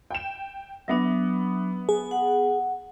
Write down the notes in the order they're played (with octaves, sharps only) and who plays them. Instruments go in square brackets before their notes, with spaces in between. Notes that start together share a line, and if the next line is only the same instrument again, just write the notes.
[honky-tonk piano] G5 E7
[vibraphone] F#3 D4 [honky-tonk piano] B3 E5
[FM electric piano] G#4
[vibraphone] F#5